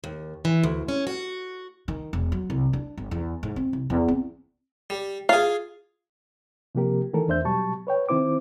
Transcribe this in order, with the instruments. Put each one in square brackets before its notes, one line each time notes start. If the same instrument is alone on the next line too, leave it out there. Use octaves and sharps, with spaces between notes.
[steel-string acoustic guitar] D#2
E3
D2
C#4
F#4
[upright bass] D#3
E1
F#3
C2
D4
G1
E2
G#2
C4
C2
E2
C4
[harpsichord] G3
[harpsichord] F4 G#4 [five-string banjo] F5
[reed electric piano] C3 F3 A#3 G4 A#4
D#3 E3 A3 A4 A#4
E2 D4 C5 E5 G6
B2 F#3 G3 A5 C#6
B4 C#5 G5
D#3 C4 E4 C5 D6